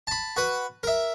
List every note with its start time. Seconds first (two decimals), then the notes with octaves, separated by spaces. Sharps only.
0.07 A5 B5
0.36 F#4 B4
0.83 A#4 E5